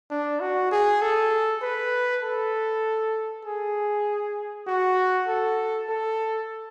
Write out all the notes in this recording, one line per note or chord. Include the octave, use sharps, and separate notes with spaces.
D4
F#4
G#4
A4
B4
A4
G#4
F#4
A4
A4